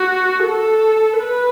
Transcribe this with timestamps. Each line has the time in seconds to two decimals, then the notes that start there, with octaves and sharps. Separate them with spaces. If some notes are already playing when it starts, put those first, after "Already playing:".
Already playing: F#4
0.43 A4
1.19 B4